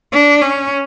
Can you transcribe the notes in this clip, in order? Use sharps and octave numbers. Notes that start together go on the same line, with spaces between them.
D4
C#4